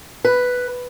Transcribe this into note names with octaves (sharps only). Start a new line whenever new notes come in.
B4